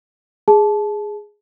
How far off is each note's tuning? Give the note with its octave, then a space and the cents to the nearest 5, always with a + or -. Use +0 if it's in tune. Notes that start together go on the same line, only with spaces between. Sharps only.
G#4 +0 A5 -20